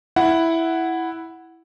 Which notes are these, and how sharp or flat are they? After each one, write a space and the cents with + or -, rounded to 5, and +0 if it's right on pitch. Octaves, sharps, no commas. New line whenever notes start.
E4 +0 F#5 +0